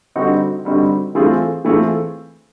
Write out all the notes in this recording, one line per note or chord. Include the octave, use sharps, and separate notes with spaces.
D3 G3 C4 D#4 F#4
D3 G3 C4 D#4 F#4
E3 A3 C4 F4 G#4
E3 A3 C4 F4 G#4